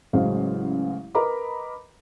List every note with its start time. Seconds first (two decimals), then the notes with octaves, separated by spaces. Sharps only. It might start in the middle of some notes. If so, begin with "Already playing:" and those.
0.13 A1 C#3 F#3 G#3 C5 F5
1.15 A#4 B4 D#5 A#5 B5 D6